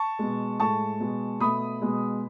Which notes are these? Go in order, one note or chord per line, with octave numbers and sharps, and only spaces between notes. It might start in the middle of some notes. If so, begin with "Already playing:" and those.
Already playing: A5 C#6
B2 G#3
A2 G#3 A5 C#6
B2 G#3
B2 A3 B5 D#6
B2 G#3